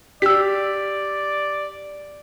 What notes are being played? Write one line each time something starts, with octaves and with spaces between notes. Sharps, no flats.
G4 D5 E6 B6